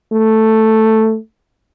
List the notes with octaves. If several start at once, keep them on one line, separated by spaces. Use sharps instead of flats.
A3